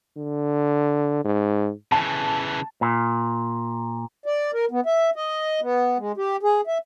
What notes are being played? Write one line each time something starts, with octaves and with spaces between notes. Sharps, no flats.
D3
G#2
C#3 E3 A5
A#2
D5
A#4
B3
E5
D#5
B3
G#3
G4
G#4
E5